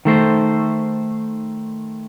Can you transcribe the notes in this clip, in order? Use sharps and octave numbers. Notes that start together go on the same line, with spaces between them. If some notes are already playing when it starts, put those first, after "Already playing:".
D#3 A3 C5